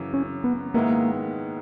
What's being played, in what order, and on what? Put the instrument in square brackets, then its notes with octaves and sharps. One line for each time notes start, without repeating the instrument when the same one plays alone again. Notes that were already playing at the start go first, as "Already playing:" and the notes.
Already playing: [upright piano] F#2 C#3 E3
[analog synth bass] C#4
B3
[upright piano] G#2 D#3 G#3 B3 E4 [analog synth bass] A#3